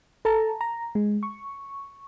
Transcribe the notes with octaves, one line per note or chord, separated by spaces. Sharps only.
A4 A5 A#5
A#5
G#3
C#6